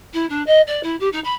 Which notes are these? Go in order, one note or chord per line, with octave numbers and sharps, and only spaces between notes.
E4
D4
D#5
D5
E4
G4
D#4
B5